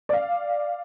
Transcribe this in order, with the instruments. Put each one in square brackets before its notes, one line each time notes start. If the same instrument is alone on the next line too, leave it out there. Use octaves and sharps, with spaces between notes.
[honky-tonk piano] D5 F5